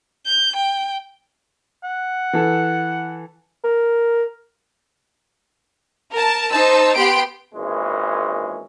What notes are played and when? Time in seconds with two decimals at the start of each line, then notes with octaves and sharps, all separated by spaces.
0.26 G6
0.56 G5
1.84 F#5
2.33 E3 A4
3.64 A#4
6.13 A#4 A5
6.50 D#4 C5 A5 E6
6.95 B3 G4 G5 C6 D7
7.54 G#1 A#2 E3 G#3 C#4